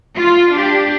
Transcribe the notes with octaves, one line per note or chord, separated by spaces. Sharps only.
F4
D4 G4